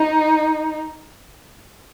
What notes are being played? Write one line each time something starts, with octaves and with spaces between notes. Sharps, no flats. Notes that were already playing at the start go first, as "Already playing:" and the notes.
Already playing: D#4